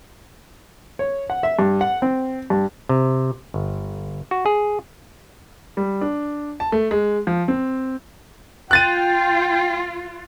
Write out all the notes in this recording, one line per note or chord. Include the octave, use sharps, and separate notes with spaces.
C#5
F#5
E5
G2
F#5
C4
G2
C3
G1
F#4
G#4
G3
D4
A5
A3
G#3
F3
C4
F4 G5 F#6 A6 D#7